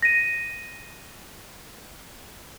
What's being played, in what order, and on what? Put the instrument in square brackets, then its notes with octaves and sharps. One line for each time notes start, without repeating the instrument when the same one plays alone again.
[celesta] A#6 D#7